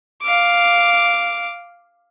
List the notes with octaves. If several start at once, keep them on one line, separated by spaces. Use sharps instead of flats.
F5 D6